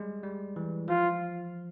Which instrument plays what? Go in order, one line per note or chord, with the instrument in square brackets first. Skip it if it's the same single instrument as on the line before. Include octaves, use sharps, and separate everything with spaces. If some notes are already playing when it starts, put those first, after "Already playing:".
Already playing: [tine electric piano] G3 G#3
G3
E3
[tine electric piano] F3 [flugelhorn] F4